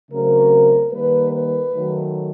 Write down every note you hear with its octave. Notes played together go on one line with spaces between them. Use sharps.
C#3 F#3 A3 C4 A#4
D#3 G3 A#3 B4
B4
D#3 F#3 A3